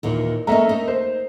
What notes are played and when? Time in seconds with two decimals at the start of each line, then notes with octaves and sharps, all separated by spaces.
0.03 D#2 A#2 E3
0.47 A3 A#3 C#4 D#5 E5 A#5
0.69 D#4
0.88 C5